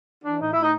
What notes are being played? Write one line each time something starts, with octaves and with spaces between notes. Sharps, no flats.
E3 D4
A2 D#4
A2 E4
D#4